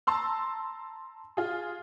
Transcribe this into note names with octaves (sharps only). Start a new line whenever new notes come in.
A5 A#5 C6 E6
F4 G#4